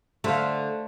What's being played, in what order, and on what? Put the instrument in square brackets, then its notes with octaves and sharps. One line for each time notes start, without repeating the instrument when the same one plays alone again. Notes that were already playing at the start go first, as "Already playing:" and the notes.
[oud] D3 [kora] A3 C5 F5